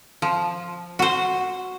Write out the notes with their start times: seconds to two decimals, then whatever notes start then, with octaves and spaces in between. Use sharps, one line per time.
0.22 F3
0.99 F#4 C5